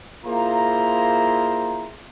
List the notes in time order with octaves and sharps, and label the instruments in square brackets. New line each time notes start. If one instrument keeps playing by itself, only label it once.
[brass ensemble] A#3 E4 F4 G#4 C5 A#5